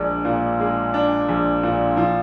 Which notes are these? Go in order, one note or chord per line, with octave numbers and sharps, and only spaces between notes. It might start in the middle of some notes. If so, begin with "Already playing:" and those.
Already playing: A#1 G#3 D4
A#2
G#3
D4
A#1
A#2
F3